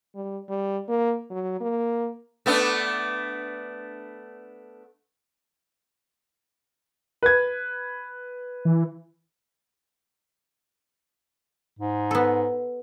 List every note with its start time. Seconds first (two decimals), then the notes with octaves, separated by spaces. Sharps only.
0.15 G3
0.49 G3
0.89 A#3
1.30 F#3
1.61 A#3
2.46 A3 B3 D4
7.23 B4 G#6
8.65 E3
11.79 G#2
12.11 B3 A4